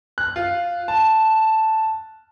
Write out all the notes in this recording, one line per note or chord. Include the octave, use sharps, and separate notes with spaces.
F#6
F4
A5